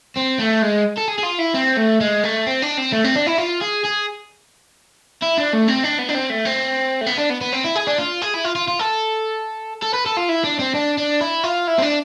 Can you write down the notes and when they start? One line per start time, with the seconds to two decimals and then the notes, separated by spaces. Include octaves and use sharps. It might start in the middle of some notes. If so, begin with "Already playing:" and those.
0.16 C4
0.39 A3
0.62 G#3
0.98 A4
1.09 G#4
1.19 G#4
1.23 F4
1.39 E4
1.55 C4
1.77 A3
2.01 G#3
2.23 A3
2.47 C4
2.62 D4
2.77 C4
2.92 A3
3.04 C4
3.16 D4
3.27 E4
3.38 F4
3.61 G#4
3.84 G#4
5.22 E4
5.38 D4
5.53 A3
5.68 C4
5.84 D4
5.99 B3
6.09 D4
6.14 C4
6.30 A3
6.45 C4
7.01 A3
7.07 B3
7.18 D4
7.30 B3
7.41 B3
7.53 C4
7.65 E4
7.76 G#4
7.87 D4
7.99 F4
8.22 G#4
8.34 E4
8.45 F4
8.56 F4
8.68 F4
8.79 A4
9.83 A4
9.94 B4
10.06 A4
10.17 F4
10.29 E4
10.44 D4
10.59 C4
10.75 D4
10.98 D4
11.21 E4
11.44 F4
11.68 E4
11.78 C4
11.82 D4